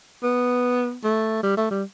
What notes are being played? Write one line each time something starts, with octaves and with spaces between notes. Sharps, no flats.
B3
A3
G3
A3
G3